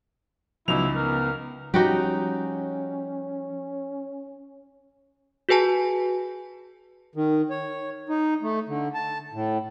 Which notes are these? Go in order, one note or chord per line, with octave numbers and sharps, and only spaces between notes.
C#2 F3 F#3 B3 D#4 E4 F7
B3 A#4
F3 G3 C#4 D#4 F#4 G4
F#4 G#4 B4 G#5 A5
D#3
C#5
D#4
A3
D3
A5
A2